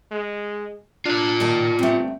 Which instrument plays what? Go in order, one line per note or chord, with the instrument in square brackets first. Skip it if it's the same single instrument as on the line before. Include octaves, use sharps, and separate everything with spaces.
[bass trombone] G#3
[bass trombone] D4 [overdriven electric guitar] F4 D5
[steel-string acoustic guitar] A#2 D#5 A5 [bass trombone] D#3
[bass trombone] G1 [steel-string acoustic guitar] A3 C4